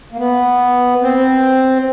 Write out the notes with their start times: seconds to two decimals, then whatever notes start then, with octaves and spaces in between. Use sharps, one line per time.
0.12 A#3
0.18 B3
1.02 C4